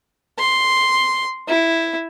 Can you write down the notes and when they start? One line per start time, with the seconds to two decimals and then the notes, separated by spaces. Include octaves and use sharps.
0.39 C6
1.48 E4